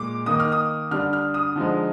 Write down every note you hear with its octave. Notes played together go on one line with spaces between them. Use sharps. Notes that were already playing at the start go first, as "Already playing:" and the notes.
Already playing: A#2 G#3 D6
D#3 A#3 D#4 D#6
F6
D#6
D3 G3 D4 F6
F6
D#6
D3 F3 G#3 D#4